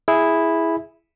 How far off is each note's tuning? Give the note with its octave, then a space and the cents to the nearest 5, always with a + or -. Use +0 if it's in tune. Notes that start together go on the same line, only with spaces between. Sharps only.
E4 +0 G#4 +0